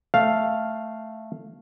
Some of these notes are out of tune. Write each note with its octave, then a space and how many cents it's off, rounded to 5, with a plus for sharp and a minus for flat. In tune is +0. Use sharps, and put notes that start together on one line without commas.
A3 +0 F5 +0